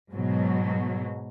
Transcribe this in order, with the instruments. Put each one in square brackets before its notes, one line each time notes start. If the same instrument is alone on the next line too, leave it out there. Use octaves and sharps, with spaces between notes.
[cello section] G#2 B2 F#3